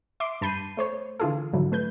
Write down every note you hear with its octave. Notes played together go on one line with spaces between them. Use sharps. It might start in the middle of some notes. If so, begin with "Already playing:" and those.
E5 C6 D6 D7
G2 A5 B5 G6 C7 D#7
A3 C5 C#5
D3 E3 F4 G#4 A4
G#2 D3 F3 F#3 E4
A3 B4 G6